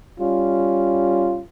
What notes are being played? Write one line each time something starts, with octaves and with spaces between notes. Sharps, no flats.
G3 C#4 F4